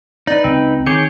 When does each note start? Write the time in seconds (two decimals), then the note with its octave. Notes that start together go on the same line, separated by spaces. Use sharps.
0.27 D#4 B4 D5
0.44 C#2 C4
0.86 D#3 G#4 C#5 D6 G6 C#7